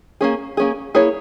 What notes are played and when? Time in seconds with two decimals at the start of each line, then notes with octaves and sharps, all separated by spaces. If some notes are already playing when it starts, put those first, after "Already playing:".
0.21 A#3 C#4 G#4
0.57 A#3 C#4 G#4
0.95 A#3 E4 G#4 C#5